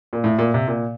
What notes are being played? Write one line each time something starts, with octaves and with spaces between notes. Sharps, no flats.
A#2
A2
A#2
C3
A#2